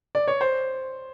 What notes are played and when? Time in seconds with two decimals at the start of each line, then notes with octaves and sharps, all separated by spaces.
0.15 D5
0.28 C#5
0.41 C5